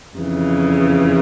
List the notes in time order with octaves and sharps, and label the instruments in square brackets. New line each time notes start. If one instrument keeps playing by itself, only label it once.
[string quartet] F2 C#3 E3